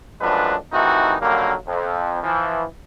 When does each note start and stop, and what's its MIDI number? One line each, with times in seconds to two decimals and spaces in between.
0.21 0.56 42
0.21 0.56 45
0.21 0.56 53
0.21 0.56 56
0.21 0.56 62
0.21 0.56 71
0.72 1.16 48
0.72 1.16 51
0.72 1.16 52
0.72 1.16 57
0.72 1.16 63
0.72 1.16 66
1.21 1.54 50
1.21 1.54 51
1.21 1.54 54
1.21 1.54 55
1.21 1.54 58
1.68 2.21 41
2.23 2.64 52
2.23 2.64 53